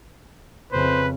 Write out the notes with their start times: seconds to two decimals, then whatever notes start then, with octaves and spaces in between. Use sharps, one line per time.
0.72 F2 C#3 B4 C5